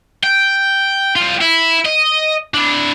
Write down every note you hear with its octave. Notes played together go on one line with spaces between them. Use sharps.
G5
G3 F4
E4
D#5
D4 E4